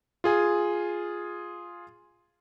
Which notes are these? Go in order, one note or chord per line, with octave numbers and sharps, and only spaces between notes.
F4 G#4 G#5